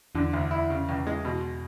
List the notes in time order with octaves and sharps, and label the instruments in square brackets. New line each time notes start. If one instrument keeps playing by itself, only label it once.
[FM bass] E2 [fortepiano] D3
[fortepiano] D2
E4
C#3
C#2
G#3
B2